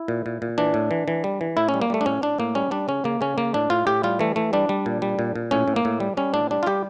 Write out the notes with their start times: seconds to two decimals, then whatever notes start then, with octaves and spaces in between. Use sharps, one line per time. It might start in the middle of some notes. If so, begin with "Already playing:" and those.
Already playing: E4
0.08 A#2
0.26 A#2
0.42 A#2
0.58 E3 D4
0.74 A2
0.91 E3
1.08 E3
1.24 G3
1.41 E3
1.57 A2 E4
1.69 C#4
1.74 G3
1.82 A#3
1.90 G3 A3
2.01 D4
2.06 A2 C#4
2.22 A2 D4
2.38 A2 A#3
2.55 G3 C#4
2.71 G3 D4
2.88 C#3 C#4
3.04 C#3 A#3
3.21 C#3 C#4
3.38 C#3 A#3
3.54 A2 D4
3.70 A2 F4
3.87 A2 G4
4.03 G3 F4
4.19 E3 A3
4.36 E3 A3
4.53 G3 D4
4.69 G3
4.86 A#2
5.02 G3
5.19 A#2
5.36 A#2
5.51 A2 C#4
5.68 A2
5.76 A#3
5.85 A2
6.00 G3
6.17 G3 C#4
6.34 A2 D4
6.51 G3 D4
6.63 F4
6.66 G3 G4